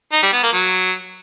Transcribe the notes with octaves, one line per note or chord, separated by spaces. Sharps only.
D#4
G3
B3
A#3
F#3